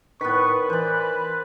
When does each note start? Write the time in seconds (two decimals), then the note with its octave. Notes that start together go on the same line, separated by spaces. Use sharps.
0.21 A2 D#3 B3 B4 C#6
0.70 E3 C5 D5 F#6